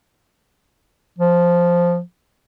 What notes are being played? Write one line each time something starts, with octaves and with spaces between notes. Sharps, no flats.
F3